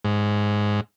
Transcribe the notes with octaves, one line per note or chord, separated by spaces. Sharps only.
G#2